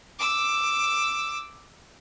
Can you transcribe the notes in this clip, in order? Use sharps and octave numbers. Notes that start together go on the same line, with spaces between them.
D6 E6